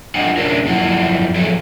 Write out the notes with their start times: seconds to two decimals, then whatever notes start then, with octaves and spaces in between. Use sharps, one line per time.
0.15 D4 F4 D#5 F#5 G#5
0.37 C#4 D4 G#4 A#4
0.66 F#2 F3 E4 F4 F#5
1.35 F3 F#3 G#4 A4